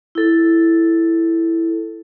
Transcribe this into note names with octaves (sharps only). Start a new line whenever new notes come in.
E4 A4